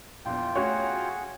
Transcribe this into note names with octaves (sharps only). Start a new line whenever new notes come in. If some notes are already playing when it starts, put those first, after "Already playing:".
A#1 E2 F4 G5
A3 C#4 F#4 G#4 C#5 F#5